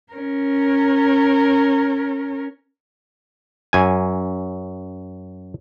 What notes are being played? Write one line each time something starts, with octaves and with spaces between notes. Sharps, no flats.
C#4 A#4
F#2 G#5